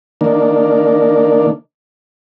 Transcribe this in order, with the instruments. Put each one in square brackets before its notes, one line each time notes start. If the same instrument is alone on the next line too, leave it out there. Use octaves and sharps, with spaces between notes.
[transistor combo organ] D#3 A#3 D4